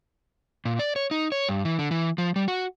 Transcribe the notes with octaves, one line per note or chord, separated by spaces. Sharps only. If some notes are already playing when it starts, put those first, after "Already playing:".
A#2
D5
C#5
D#4
C#5
G2
E3
D3
E3
F3
G3
F#4